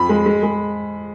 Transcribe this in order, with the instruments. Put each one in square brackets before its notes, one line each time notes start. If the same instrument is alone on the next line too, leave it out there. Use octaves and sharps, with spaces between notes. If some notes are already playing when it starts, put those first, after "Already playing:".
Already playing: [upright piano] F2 B5
G#3
G#3
G#3